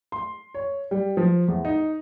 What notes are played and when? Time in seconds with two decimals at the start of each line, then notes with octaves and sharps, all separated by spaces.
0.12 C6
0.54 C#5
0.91 G3
1.17 F3
1.48 E2
1.65 D#4